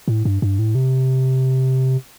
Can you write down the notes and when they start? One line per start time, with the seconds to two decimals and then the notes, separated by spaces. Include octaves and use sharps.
0.08 A2
0.25 G2
0.42 G2
0.59 A2
0.75 C3